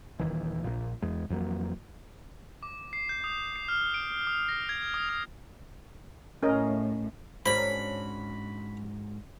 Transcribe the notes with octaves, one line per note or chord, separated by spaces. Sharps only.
D#1 D#3 E3
A#1 A#2
E2 G#3
F2 E3 F#3 A#3
D6
C7
G6
D#6
C7
F6
D7
D#6
A#6
G#6
D#6
D#6
A2 C#4 A#4 D#5
G#2 C#4 D4 F#4 A#4 C5 B5